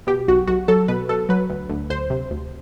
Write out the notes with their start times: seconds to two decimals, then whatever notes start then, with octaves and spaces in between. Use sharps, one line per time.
0.07 B2 G4
0.28 B1 F#4
0.47 B1 F#4
0.68 F#3 A4
0.88 B2 B4
1.09 B2 A4
1.29 F#3 B4
1.49 D2
1.70 D2
1.90 D2 C5
2.10 C3
2.31 D2